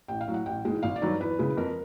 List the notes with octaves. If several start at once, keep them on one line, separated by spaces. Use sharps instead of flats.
A1 G5
F5
A2 F#3
F#5
A1 G5
G#2 E3 G#3
G#1 F5
D5
G2 D#3 F#3
E2 B4
C#3 E3 G#3
F2 A#4